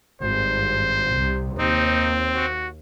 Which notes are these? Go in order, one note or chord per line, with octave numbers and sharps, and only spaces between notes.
G#1 G2 C5
C2 C3
D#2 C4 D#4
F#4